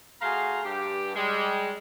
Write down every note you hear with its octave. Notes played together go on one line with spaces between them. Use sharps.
A3 F#4 G#4 F5 A#5 C6
G2 G4
G3 G#3